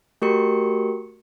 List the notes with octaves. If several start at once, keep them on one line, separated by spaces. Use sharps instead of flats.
A3 F#4 G4 A#4 C#6 C#7